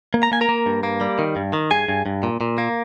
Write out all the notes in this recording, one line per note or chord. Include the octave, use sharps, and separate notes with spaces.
A#3
A#5
A#3 G#5
A#4 A#5
A#3
G2
A#3
G3
D#3
G2
D#3
G2 G#4 G#5
G2
G2
A#2
A#2
A#3